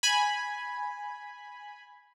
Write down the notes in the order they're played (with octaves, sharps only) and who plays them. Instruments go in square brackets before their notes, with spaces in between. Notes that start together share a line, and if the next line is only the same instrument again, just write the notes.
[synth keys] G#5 B5